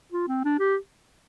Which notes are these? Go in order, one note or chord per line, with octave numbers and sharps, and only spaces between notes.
F4
C4
D4
G4